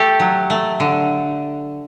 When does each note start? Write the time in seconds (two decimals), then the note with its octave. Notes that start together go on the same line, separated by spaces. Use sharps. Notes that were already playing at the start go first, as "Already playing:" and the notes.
Already playing: A3 G4 A4
0.20 F#3
0.50 A3
0.80 D3